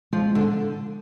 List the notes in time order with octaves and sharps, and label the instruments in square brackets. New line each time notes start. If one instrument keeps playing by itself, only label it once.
[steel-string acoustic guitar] F3 [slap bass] G#3
[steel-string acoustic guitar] D3